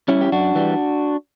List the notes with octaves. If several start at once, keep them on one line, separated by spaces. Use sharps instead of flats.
G3 C#4 E4
G4
F#2 D4 F#4
E3 G3